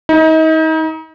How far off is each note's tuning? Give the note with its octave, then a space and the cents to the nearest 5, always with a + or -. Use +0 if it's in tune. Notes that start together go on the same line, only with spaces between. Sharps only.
D#4 +35